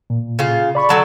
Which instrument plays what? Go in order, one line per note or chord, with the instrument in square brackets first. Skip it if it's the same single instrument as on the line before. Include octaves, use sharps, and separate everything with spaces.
[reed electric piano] A#2
[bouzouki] C#3 F4
[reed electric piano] D5 B5 C#6
[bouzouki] D3 F#3 A4